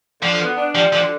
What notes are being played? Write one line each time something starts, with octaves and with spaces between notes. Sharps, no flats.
D3 F3
B3
D4
F3 G3
D3 F3